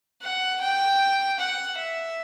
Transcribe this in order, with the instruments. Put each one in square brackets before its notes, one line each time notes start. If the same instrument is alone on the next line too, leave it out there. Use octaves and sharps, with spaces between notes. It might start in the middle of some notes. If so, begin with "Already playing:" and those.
[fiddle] F#5
G5
F#5
E5